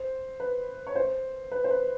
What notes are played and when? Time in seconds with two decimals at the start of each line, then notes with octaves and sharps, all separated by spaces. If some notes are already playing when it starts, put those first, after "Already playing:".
Already playing: C5
0.40 B4
0.87 C#5
0.96 C5
1.52 B4
1.64 C5
1.70 B4